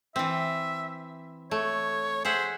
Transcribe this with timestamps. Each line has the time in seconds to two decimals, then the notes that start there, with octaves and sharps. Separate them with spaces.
0.16 E3 C4 E5
1.51 A3 C#5
2.25 G#4 C5 E5 F#5